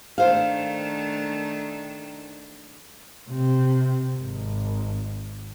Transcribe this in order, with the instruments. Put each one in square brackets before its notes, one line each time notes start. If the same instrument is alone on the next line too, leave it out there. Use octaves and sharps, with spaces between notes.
[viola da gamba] D#3 A3 D4 [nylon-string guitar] C5 F5
[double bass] C3
G#1